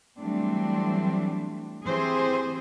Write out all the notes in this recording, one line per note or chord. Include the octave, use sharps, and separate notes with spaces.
E3 F#3 G3 A3 C4 D4
E3 C4 G4 G#4 C5